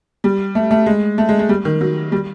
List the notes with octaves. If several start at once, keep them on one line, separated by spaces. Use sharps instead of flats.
G3
A3
A3
G#3
A3
G#3
G#3
G3
D#3
F#3
G3